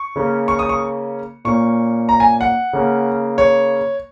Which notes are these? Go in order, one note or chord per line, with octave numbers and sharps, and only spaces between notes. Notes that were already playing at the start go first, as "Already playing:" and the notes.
Already playing: C#6
C#3 A#3 C#4
C#6
D#6
C#6
A#2 A#3 C#4 C#6
A#5
G#5
F#5
C#3 A#3 C#4
C#5